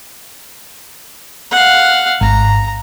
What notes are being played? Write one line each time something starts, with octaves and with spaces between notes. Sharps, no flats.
F5 F#5
G#1 A#5